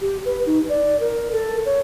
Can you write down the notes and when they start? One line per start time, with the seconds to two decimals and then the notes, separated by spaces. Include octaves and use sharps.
0.01 G4
0.25 B4
0.46 D#4
0.69 D5
1.00 A#4
1.33 A4
1.66 C#5